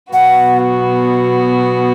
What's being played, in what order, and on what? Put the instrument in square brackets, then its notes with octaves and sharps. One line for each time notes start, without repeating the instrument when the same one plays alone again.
[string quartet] B2 F#3 B3 F#4 [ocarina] F#5